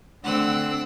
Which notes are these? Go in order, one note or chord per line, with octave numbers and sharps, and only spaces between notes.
D3 A3 C4 F#5 E6